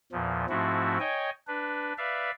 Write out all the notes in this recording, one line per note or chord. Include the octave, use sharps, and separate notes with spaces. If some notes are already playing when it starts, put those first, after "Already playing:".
E2 A#2 F3
G#2 F3 A3 C4 E4 F#4
C#5 D#5 G5 G#5
D4 B4
B4 D5 E5 F5